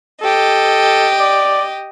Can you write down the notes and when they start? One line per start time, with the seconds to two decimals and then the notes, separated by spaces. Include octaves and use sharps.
0.21 G4 A4 D#5
1.18 D5